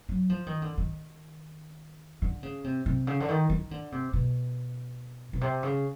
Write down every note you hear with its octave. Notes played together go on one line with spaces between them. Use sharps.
F#3
F3
D#3
D3
D#3
D3
C#3
C3
C3
C#3
D3
D#3
D#3
D3
C3
B2
B2
C3
C#3